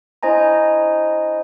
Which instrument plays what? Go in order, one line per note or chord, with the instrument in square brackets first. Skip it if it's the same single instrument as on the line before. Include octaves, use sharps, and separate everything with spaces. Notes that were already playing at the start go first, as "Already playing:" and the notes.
[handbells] D4 E4 C5 D#5 G#5 A#5